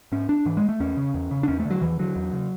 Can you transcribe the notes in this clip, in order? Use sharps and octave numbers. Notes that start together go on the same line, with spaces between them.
G#2 C#4
D4
G#2 E3
G#3
A3
E2 C#4
C#3
E2
C#3
D4
E2 C#4
A3
D3
F#3
E2 E3
D3 F#3
E2
C#3